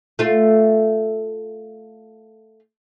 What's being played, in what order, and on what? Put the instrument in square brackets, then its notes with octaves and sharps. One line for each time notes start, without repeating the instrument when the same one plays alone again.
[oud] A3 F4